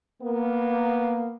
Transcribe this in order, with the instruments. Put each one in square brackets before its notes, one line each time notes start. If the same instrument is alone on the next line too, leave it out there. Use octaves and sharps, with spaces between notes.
[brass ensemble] A#3 [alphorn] B3